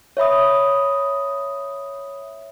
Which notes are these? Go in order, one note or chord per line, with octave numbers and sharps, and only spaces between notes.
C#5 E5 B5 D#6